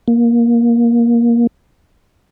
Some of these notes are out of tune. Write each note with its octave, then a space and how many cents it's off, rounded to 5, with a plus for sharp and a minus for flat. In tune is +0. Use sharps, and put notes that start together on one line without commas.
A#3 +15